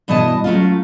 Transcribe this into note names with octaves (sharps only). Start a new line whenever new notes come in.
G2 B2 E3 D#5 A5
F#3 A3 C#4 F4